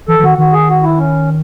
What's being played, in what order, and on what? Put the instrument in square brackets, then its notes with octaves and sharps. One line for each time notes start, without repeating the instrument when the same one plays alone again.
[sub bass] E3 [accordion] A4
[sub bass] E3
[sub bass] D#3 [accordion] F#4
[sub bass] D#3 [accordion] F#4
[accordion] G#4
F#4
E4
C#4